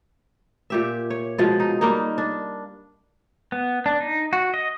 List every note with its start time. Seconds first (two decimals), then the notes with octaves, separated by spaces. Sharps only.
0.70 A#2 G4 E5
1.10 C#5
1.38 B2 F3 G#3 F5
1.60 D#4
1.81 G3 A#3 D#4
2.18 D4
3.52 B3
3.86 D4
4.00 D#4
4.33 F#4
4.54 D#5